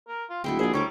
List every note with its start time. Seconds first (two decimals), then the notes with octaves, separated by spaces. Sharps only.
0.08 A#4
0.30 F4
0.44 D1 G#3 E4 F#4 G5
0.59 A#1 G#4 C5 D5
0.73 D2 G3 A#4 C#5 D6